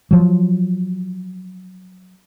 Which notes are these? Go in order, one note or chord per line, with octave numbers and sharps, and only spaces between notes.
F3 F#3